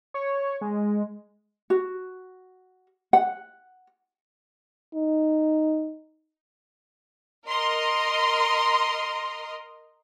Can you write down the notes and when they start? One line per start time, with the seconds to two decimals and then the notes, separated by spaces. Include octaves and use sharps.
0.14 C#5
0.61 G#3
1.70 F#4
3.13 F#5
4.94 D#4
7.47 A#4 D#5 C6